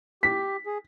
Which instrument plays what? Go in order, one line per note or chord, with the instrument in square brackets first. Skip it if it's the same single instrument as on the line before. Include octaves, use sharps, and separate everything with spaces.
[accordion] G4 [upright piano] B6
[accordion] G#4